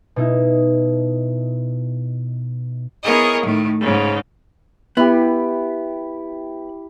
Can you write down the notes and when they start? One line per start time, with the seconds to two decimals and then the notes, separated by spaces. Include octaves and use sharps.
0.16 B2 D#4 E4
3.03 B3 E4 G#4 A#4 C#5 D#5
3.43 A2 D#3 A3
3.79 G#2 C#3
4.97 B3 E4 G4